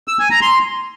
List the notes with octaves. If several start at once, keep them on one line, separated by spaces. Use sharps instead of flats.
E6
G#5
A#5
C6